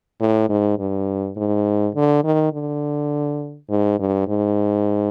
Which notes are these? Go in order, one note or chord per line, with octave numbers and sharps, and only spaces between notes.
A2
G#2
G2
G#2
D3
D#3
D3
G#2
G2
G#2